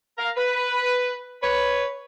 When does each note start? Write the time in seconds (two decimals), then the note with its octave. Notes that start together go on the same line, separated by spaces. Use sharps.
0.17 A#4 F5
0.37 B4
1.41 B4 C#5